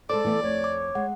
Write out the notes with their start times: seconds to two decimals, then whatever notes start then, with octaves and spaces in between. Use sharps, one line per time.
0.10 G#3 A4 C5 D5 D6
0.24 E3 A3 B3
0.43 F2 C#5
0.64 D6
0.95 G#3 F#5